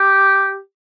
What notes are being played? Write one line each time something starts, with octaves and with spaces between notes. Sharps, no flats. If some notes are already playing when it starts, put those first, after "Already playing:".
Already playing: G4